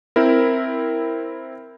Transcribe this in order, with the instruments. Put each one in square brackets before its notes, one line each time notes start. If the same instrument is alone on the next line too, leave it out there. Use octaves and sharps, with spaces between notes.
[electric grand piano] C4 E4 A#4